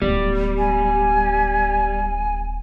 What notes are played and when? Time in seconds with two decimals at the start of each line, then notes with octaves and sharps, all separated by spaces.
0.02 D1 G3 B3
0.58 G#5